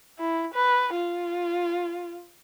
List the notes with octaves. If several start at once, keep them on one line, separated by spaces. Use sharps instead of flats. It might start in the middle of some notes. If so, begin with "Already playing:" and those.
E4
B4
F4